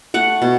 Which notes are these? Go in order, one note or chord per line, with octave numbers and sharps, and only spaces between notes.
A3 F#5
B2